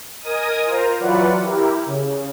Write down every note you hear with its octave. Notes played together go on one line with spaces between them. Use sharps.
A#4 D#5 G#5 D#6
F4 A#4 C5 A#5
E3 F#3 F4 B4 D5 F#5
E4 G4 A#4
C#3